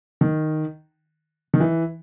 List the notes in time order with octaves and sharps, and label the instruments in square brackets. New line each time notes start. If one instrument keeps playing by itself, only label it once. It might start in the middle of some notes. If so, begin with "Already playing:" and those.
[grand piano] D#3
D#3
E3